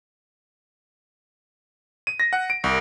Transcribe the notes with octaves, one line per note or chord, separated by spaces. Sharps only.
D#7
A#6
F#5
D7
C2